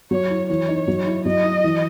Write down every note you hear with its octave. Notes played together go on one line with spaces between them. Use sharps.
F#3 C#5
E4
E3 C#5
D#4
F#3
E4
F#3 D#5
E4
E3